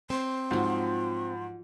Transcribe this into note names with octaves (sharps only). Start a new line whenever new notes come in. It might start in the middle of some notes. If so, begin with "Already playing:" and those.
C4 C6
G#2 F3 F#3